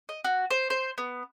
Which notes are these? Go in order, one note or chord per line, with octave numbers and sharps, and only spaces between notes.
D#5
F#4
C5
C5
B3